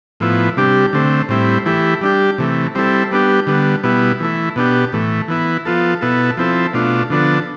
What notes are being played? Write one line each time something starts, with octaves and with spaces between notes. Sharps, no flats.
A2 F3 B3 E4
C3 G3 D4 G4
D3 A3 C4
A2 G3 C4 E4
E3 A3 E4 G4
G3 D4 G4
C3 E3 A3
G3 C4 E4 A4
G3 B3 D4 G4
D3 G3 B3
B2 G3 B3 E4
E3 A3 E4
B2 B3 D4 G4
A2 E3 A3
E3 B3 E4
F3 B3 F4 A4
B2 B3 E4 A4
F3 C4 E4 A4
B2 A3 D4 F4
D3 F3 B3 D4 A4